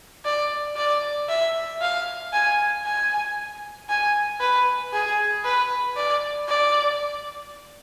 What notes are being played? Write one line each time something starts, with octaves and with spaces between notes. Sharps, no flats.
D5
D5
E5
F5
G#5
G#5
G#5
B4
G#4
B4
D5
D5